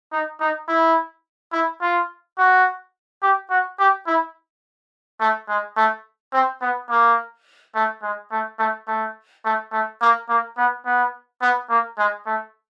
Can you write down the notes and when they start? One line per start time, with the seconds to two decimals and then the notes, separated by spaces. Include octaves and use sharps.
0.12 D#4
0.40 D#4
0.68 E4
1.52 E4
1.81 F4
2.38 F#4
3.22 G4
3.50 F#4
3.79 G4
4.07 E4
5.20 A3
5.48 G#3
5.77 A3
6.33 C4
6.61 B3
6.90 A#3
7.75 A3
8.02 G#3
8.31 A3
8.59 A3
8.87 A3
9.45 A3
9.72 A3
10.01 A#3
10.29 A#3
10.57 B3
10.85 B3
11.42 B3
11.70 A#3
11.98 G#3
12.26 A3